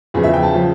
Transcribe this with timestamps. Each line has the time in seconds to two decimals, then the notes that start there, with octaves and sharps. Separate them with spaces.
0.14 E2 C#3 F3
0.24 E5
0.34 G5
0.43 A5
0.54 C#3 F3